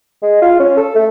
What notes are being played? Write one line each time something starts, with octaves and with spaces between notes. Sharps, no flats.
G#3
F4
C#4
A4
A3